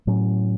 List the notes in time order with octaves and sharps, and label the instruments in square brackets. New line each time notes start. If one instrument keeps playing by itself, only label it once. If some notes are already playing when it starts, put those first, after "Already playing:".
[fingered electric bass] A2 F#3 C#4